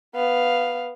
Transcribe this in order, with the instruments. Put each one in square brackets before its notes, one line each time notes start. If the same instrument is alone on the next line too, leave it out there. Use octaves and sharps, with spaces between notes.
[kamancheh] B3 F5